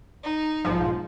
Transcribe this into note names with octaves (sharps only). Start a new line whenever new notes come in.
D#4
B1 G#2 F3